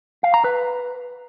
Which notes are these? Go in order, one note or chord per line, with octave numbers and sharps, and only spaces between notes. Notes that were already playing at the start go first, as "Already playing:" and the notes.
F5
A#5
B4